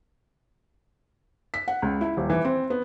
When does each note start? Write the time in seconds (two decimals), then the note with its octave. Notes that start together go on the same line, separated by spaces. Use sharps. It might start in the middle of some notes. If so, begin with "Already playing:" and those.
1.54 B6
1.68 F#5
1.82 C#2
2.01 E4
2.17 D#1
2.30 E3
2.45 C4
2.70 B3